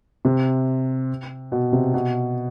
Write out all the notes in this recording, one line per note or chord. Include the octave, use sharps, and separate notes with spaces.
C3
B2
C3
B2